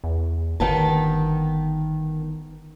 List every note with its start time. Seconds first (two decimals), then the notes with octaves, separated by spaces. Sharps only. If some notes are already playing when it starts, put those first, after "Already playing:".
0.04 E2
0.60 G1 D#3 B3 A5